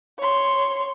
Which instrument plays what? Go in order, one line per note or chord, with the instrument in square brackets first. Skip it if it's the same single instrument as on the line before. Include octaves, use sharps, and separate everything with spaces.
[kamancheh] C#5 C6